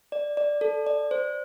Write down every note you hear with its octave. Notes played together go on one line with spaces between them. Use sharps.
D5
D5
A4
D5
C5